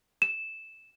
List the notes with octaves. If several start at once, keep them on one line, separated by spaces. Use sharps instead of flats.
E7